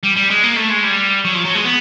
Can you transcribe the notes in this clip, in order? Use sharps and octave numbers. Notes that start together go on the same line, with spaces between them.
G3
G3
G#3
A#3
A3
G#3
G3
F#3
F3
F#3
G#3
B3